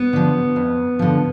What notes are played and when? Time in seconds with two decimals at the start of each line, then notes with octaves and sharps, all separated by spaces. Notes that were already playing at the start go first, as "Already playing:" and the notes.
Already playing: B3
0.13 D3 F3
0.56 F2
0.99 D3 F3